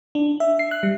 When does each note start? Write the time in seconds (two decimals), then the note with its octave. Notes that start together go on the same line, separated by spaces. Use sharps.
0.15 D4
0.40 E5
0.59 C7
0.71 F#6
0.83 G3